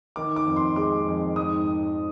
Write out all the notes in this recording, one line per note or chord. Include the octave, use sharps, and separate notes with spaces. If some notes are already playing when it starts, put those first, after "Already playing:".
D#3 D6
D6
F2
C6
G#3 D6
F2
G#2 D#6